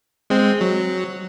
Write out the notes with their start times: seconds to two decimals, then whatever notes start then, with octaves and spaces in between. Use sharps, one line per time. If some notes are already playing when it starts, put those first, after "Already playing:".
0.30 G#3 C4
0.61 F#3